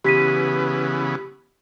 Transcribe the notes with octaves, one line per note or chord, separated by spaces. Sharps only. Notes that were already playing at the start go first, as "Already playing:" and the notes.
C#3 E3 B3 G4 B6 D#7